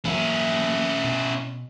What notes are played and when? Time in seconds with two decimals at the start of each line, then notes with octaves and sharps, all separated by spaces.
0.05 E3 F#3 A#3 C#4 E4
1.04 B2